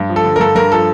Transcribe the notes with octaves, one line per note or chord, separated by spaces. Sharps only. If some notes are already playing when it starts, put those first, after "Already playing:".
Already playing: G2
F3
A4
D3
A#4
G2 A4
G2 A#4
F3 A4